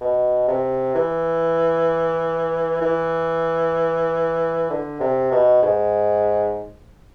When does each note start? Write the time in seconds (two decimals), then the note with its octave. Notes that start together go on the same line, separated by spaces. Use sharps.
0.01 B2
0.48 C3
0.95 E3
2.82 E3
4.70 D3
5.00 C3
5.32 B2
5.62 G#2